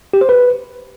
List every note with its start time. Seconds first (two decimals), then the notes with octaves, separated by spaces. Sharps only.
0.13 G4
0.21 C5
0.29 B4